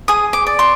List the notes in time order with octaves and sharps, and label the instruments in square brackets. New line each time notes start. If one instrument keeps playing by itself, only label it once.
[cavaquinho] G#4 D#6
D6
D5
C6